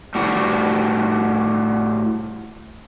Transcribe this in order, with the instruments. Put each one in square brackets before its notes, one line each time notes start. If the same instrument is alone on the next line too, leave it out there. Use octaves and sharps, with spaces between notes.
[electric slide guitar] A2 G3 F#4